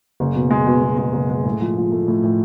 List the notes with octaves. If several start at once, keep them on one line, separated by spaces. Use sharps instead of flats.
F#1
B2
G#3
B2
B2
G#3
F#1
G#3
A2
F3
F3
A3
A2
A2